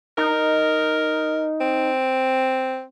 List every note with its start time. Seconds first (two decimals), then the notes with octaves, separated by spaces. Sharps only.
0.18 D#4 A#4
1.61 C4